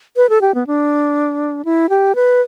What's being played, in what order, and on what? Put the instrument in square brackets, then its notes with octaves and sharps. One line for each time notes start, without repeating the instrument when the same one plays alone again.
[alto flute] B4
A4
G4
B3
D4
E4
G4
B4